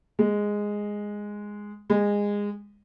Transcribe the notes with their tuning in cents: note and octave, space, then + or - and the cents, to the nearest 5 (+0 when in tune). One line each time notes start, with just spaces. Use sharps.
G#3 -5
G#3 -20